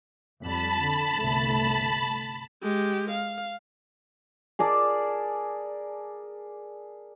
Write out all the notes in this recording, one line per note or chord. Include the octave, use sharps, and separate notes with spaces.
F2 G3 A5 B5
D3
G1 C2 A3
G#3 G4
F5
G#4 A#4 D5 A5